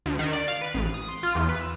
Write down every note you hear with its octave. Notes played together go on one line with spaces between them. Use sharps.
D2
D#3
D5
F5
B4
A1
D#6
C6
F4
E2
B4
E6